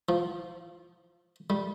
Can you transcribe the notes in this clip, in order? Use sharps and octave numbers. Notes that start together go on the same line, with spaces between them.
F3
G3